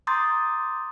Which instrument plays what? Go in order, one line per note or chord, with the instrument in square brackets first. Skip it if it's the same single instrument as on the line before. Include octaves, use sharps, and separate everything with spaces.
[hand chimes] A#5 C6 D6 D#6 G6 A6